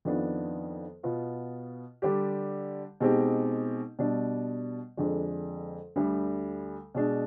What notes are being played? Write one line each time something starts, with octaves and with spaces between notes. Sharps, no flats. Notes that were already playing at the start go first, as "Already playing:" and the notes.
F2 D#3 B3 D4 F4
B2 B3 F4
D3 G3 D4 G4
B2 G#3 C4 D#4 G4
B2 G3 D4
F2 D3 G#3 D4
D2 D3 G3
B2 G#3 D4